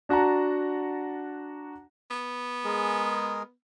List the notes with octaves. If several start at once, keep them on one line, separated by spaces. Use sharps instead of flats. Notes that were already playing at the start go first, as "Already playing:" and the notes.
D4 F#4 F#5 A5 A#5
B3
G#3 G#4 A#4